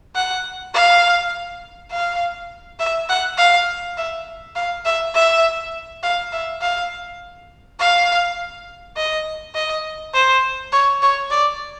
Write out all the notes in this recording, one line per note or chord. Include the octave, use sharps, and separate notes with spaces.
F#5
F5
F5
E5
F#5
F5
E5
F5
E5
E5
F5
E5
F5
F5
D#5
D#5
C5
C#5
C#5
D5